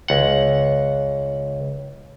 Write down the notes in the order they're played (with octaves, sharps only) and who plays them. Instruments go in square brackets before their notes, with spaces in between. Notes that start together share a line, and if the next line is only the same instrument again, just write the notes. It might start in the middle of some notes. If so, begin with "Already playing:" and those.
[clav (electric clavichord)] C#2 F#5